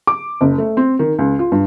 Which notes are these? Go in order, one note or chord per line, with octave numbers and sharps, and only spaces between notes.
D6
F#1
A3
C4
D#3
C#2
F4
G2